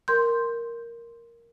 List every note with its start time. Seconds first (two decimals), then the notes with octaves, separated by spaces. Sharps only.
0.08 A#4 C6 G6